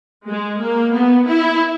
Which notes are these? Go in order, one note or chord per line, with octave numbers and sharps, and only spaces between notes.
G#3
A#3
B3
E4